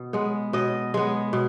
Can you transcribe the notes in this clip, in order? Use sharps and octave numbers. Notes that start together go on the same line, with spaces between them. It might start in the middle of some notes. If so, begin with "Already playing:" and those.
Already playing: B2
G#3 B3
B2 D#5
G#3 B3
B2